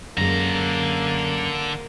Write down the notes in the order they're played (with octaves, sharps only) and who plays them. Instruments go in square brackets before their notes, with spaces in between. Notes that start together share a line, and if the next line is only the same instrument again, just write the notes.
[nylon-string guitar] F#2 G#3 [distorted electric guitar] D3 A#5 [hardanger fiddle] A#3